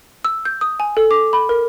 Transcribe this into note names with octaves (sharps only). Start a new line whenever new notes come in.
E6
G6
D#6
G#5
A4
D6
B5
A#4